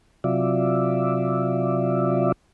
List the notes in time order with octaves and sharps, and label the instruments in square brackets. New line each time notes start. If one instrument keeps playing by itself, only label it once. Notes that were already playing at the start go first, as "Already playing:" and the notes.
[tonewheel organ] C3 F#3 F4 D5 E5